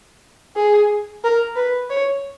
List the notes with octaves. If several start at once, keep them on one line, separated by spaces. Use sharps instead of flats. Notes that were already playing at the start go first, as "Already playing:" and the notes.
G#4
A#4
B4
C#5